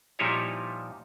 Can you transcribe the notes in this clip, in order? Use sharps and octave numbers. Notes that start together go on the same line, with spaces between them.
A#2 F3 G3 D#4 E4 C#5